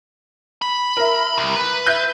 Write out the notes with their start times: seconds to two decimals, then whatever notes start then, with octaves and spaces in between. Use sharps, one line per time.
0.62 B5
0.97 A#4 E5
1.38 C2
1.56 B4
1.86 E5 G6